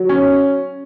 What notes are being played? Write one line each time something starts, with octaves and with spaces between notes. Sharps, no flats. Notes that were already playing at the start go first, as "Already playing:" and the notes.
Already playing: F#3
C#4